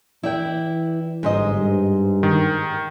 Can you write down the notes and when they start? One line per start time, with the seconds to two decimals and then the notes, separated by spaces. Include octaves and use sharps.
0.23 E3 E4 D5 G5
1.23 G1 G#2 C5 D#5
1.57 G2
2.23 D#3